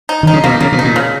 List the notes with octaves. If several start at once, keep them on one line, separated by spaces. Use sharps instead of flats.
D#4
D#3 D#4
C#3
B2 A#3
C#3 A#3
B2
D#4
A#2
C#3